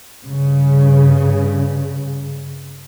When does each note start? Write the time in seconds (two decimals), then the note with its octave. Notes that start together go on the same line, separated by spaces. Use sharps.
0.23 G2 C#3